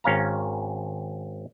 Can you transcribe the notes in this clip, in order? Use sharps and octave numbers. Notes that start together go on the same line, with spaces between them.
G#1 C#4 F5 A#5